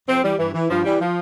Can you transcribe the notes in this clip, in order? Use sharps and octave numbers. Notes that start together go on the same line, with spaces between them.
F2 C4
E3 G3
G2 E3
E3
G2 F3
E3 G3
F3